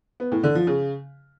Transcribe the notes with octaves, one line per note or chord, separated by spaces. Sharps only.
B3
A2
D3
F3
C#3